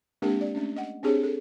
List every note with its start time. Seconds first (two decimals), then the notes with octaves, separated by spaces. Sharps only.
0.22 G#3 A#3 C4 D4 G4 A#4
0.41 D5
0.55 A3 C#4 D4
0.76 D#5 F#5
1.03 C4 D4 G4 G#4 C5 C#5
1.23 A4